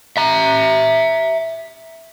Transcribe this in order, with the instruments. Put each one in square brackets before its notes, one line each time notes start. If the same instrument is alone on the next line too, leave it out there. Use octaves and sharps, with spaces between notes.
[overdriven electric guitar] E5 A#5